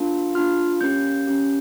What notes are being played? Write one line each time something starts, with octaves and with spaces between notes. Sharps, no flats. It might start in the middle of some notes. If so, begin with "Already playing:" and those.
Already playing: A#3 D4 F4
A#3 D4 F4 F6
A#3 C#4 G4 G6
A#3 C#4 G4